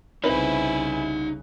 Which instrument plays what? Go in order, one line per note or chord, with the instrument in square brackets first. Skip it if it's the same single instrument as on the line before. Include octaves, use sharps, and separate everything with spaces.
[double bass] C2 C#3 [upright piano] C4 B4 [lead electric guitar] D#4 E5 [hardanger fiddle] E4 G#5